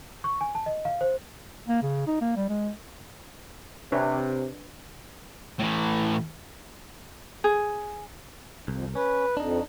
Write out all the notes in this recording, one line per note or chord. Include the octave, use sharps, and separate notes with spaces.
C#6
G#5
A5
D#5
F5
C5
A#3
C#3
D#4
A#3
G3
G#3
C3 D4 B4 C#5
A2 E3
G#4
C2 F2
C#4 B4
F2 D4 D#4